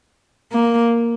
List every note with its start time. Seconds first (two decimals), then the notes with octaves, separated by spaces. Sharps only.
0.52 A#3